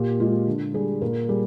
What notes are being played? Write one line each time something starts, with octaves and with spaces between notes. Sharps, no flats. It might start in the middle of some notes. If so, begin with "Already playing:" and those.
Already playing: A#2 G4
G#3 F4
D3
G3 G#4
A#2 A#4
G3 G#4